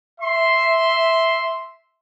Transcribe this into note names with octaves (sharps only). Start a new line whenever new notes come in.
E5 C6